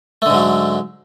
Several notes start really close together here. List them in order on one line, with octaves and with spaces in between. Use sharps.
A3 D3 G#2 F#3